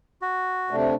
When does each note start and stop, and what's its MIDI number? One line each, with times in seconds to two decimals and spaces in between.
0.22 0.76 66
0.71 0.95 48
0.71 0.95 57
0.71 0.95 62